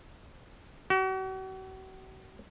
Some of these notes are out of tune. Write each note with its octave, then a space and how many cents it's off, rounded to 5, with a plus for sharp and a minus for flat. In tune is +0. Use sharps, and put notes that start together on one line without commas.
F#4 +40